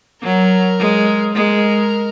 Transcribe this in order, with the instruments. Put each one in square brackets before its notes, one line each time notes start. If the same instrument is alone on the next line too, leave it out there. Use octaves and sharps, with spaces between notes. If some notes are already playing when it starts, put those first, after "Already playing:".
[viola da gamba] F#3 [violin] A#4
[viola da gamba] G#3
[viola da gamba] G#3 [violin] A#4